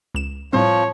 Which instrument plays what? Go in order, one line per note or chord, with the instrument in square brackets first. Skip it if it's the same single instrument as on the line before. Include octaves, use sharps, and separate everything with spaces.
[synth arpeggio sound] C#2 E7
[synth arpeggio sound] A2 G3 C4 [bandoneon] F3 [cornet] C#5